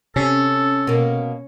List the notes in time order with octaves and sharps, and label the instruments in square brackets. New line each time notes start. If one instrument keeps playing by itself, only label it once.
[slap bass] C3 [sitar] C#4 [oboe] A4
[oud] B2 A#3